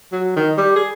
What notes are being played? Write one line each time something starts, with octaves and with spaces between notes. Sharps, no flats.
F#3
D#3
G3
G#4